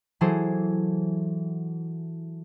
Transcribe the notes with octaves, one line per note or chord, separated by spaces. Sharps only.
E3 F#3 E4 G#4 A4 C5